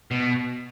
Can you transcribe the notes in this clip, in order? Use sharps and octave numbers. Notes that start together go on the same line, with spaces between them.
B2